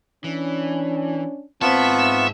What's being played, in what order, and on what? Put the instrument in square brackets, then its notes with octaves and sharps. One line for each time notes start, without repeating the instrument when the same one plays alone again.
[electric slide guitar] E3 [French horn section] C#4 D4
[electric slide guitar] G#2 D#5 A5 [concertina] B3 F4 C#6 [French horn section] C4 [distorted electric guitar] E5